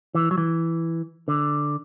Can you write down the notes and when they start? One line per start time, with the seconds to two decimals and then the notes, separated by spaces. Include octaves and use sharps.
0.15 E3
0.31 F#3
0.38 E3
1.28 D3